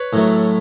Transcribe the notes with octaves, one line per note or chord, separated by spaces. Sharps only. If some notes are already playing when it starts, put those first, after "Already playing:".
Already playing: B4 C#5
A2 F#3 A3